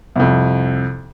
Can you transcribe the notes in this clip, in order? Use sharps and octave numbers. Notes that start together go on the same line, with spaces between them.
C2 F2